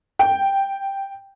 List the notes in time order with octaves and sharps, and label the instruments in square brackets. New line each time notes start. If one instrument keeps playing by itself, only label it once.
[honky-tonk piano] G5